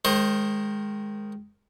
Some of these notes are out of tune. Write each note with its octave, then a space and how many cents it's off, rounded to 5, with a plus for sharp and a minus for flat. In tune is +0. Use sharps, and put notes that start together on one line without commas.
D#3 +0 G#3 +0 C5 +30